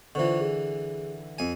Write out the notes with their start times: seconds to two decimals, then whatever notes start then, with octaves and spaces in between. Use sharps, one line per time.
0.15 D3 E3 F4 C5 C#6
0.40 G#4
1.38 F2 G#5